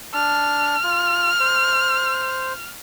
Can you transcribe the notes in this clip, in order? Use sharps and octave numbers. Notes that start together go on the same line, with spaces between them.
D4 A5 F6
F4
C5